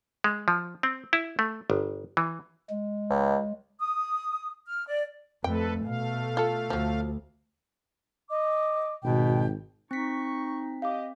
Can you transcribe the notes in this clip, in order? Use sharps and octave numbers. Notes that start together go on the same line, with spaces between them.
G#3
F3
C4
E4
A3
G1
E3
G#3
C#2
D#6
F6
D5
F2 A3 A4 B4 G5
B2 A3 F5
F4 A4
D2 F3 F#3
D#5 D6
G#1 B2 G5
C4 D#4 C#6 B6
G4 D#5 F5 D6